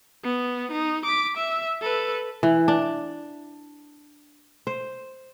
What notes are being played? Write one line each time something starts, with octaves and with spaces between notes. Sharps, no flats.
B3
D#4
D6 B6
E5
A4 B4
E3
D4
C5